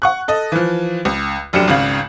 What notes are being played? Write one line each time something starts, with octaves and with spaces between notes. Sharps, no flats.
F#5 C#6 F#6
A4 D#5
E3 F3
C#2
F1 F#2 D4 G4 C#7 E7
G#1 C#2 C#3 F5 F#7